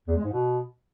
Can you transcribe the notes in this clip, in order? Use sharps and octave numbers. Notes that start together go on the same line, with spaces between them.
E2
G#3
G#2
B2